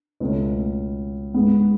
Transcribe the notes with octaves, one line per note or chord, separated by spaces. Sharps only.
C#2 B2 A3 C#4
G#2 G#3 B3